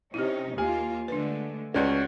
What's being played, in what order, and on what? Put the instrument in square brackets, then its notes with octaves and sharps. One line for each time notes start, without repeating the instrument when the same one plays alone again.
[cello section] C3 C#4 D#4 [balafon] E4 G4
[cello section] D#2 A#3 F4 [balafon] G4 [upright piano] G#5
[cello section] D3 G#3 A3 [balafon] D4 B4
[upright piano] C#2 C#4 [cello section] F#4 [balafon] B4 D5 F#5